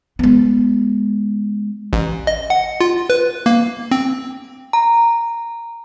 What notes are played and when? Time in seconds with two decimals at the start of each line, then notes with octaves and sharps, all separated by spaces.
0.19 G#3 B3
1.93 A1
2.27 D#5
2.50 F#5
2.81 F4
3.10 B4
3.46 A#3
3.91 C4
4.73 A#5